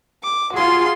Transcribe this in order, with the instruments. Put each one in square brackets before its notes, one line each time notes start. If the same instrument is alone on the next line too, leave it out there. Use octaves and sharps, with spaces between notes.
[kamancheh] D6
[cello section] F4 G#4 [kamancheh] F#4 C6